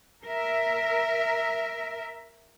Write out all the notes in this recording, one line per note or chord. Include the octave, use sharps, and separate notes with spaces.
A#4 E5